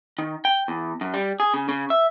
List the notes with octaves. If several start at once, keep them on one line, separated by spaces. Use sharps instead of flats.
D#3
G5
E2
F#2
G3
G#4
C#3
C#3
E5